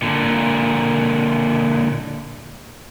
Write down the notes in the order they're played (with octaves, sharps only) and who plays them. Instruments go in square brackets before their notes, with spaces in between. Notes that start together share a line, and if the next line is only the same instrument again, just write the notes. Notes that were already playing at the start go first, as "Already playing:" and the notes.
[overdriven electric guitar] A#2 D3